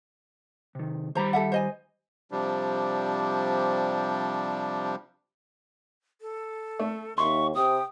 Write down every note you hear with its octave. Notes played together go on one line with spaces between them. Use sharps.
C3 D#3
D#3 G3 C5 A#5 B5
A4 E5 F#5
C5 D#5 G#5
C3 F3 G3 D4
A4
A3
D#2 E5 C6 C#6
C3 G5 D#6